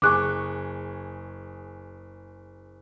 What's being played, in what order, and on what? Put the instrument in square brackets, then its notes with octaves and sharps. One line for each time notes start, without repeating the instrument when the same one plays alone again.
[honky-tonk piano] F#1 G#4 C#6 [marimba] D6 F#6